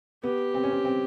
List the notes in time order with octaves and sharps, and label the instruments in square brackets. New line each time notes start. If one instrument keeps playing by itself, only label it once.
[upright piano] B3 [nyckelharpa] G4
[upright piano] C4
C#4
C4
C4